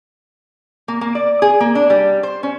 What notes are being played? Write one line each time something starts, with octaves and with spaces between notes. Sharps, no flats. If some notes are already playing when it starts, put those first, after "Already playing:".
A#3
A#3
D5
G#4
A#3
D4
G3
C5
C#4